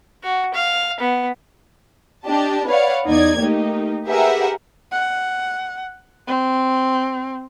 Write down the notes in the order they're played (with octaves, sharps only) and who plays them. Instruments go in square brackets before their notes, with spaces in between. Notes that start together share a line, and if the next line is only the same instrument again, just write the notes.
[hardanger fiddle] F#4
F5
B3
[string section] D4 G4 D#5 A5
B4 C#5 D5 F5 F#5
E2 D#4 D5 G#6
A3 A#3 D#4 G4
G4 G#4 A#4 B4 E5 F#5
[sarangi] F#5
C4